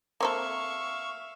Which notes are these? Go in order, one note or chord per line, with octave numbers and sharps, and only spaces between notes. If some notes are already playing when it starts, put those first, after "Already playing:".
A#3 C4 A4 E5 F5 C#6